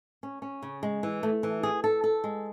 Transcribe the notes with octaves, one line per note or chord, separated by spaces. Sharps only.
C#4
C#4
C#3
G#3
E3
A3
E3
G#4
A4
A4
G#3